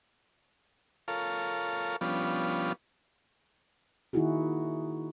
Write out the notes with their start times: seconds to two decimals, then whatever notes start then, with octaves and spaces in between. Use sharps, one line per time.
1.08 F4 A4 A#4 C#5 F5
2.01 F3 G3 B3 C#4 D4 F4
4.13 D#3 A#3 D#4 E4 F#4 G#4